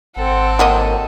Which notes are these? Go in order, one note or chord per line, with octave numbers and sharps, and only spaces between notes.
G#1 C4 A4 F#5
F#3 A#3 D#5